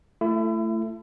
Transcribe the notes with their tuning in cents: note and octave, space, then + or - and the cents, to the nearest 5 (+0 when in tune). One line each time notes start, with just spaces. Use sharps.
A3 +10 E4 +35